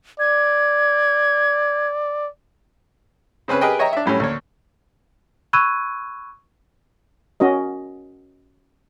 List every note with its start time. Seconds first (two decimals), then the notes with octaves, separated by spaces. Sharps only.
0.20 D5 G#6
3.48 C#3 C4 C#4 B4
3.61 G4 G#4 A#4 B4 D#5 G5
3.79 C#5 D#5 E5 G5 A#5
3.93 D4 E5
4.06 F#2 A2 G3 C#4
4.20 D2 A#3 C#5
5.53 B5 C#6 E6 F#6 G#6 D#7
7.40 C#4 F#4 A#4 D#5